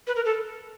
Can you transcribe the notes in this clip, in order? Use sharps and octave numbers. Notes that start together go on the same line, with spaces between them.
B4
A#4
A4